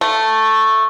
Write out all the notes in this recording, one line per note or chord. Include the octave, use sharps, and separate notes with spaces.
A3